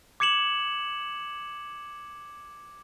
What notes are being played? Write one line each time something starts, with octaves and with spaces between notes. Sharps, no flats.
D6 G#6 C#7 E7 F#7